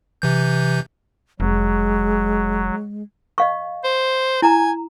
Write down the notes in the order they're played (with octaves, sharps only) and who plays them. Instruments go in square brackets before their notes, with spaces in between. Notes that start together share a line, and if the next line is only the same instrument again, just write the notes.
[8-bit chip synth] C3 E3 G6
[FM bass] F1 [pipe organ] F#3 [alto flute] G#3
[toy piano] D#5 F5 C#6
[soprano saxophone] C5
[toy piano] E4 A#5 [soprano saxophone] G#5